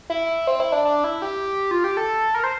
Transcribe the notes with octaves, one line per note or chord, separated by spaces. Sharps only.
E4
C4
E4
D4
D4
E4
G4
F4
G4
A4
A#4
C5